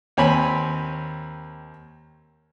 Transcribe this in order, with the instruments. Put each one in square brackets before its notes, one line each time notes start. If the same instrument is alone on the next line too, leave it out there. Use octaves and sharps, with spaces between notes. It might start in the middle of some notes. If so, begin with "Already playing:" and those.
[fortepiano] D#2 C4 C#5 G#5 B5